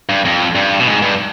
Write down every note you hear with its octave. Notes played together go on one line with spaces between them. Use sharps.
G2
F2
G2
B2
G#2
G2